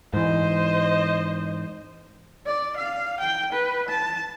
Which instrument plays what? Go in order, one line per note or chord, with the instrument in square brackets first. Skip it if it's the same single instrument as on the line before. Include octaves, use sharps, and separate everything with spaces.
[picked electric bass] G#2 E3 [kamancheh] C5 D#5
[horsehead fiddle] D5
F5
G5
B4
A5